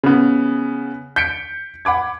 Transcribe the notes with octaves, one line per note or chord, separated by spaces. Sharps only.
C#3 B3
G6 B6 C#7 D7
F#5 B5 D6 G#6